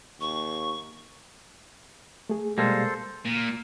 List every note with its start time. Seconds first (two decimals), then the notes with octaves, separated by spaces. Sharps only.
0.21 D#2 C#6
2.29 A3 G#4
2.58 B2 G3 G#3 A#3 A4 C5
3.25 A#2